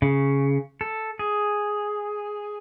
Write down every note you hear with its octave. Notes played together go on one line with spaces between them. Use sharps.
C#3
A4
G#4